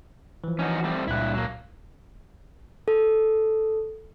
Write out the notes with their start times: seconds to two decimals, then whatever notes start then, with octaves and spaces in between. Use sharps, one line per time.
0.44 E3 F3
0.59 C#4 D#4 F#4
0.84 G3 A3 C4
1.07 C#2 G2 A#2 E4 F#6
1.34 F#3 A#3
2.88 A4